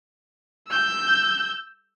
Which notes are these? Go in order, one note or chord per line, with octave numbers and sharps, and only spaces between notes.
E6 G6